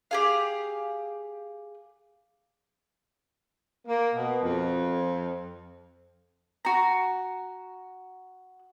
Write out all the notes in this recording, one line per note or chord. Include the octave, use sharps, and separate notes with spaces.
G4 G#4 F5
A#3
B2
F2
F#4 A#5